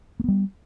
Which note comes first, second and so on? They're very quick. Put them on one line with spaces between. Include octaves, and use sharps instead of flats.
A#3 B3 G3